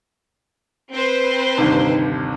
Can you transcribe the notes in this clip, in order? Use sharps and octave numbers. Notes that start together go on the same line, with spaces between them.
C4 B4 C5
G1 D#2 C3 D#4